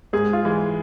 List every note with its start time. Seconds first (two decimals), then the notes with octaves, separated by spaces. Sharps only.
0.13 G#2 G#4
0.33 F4
0.45 E3 G#3